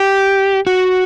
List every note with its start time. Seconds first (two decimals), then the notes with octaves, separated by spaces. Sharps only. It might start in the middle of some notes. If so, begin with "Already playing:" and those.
Already playing: G4
0.67 F#4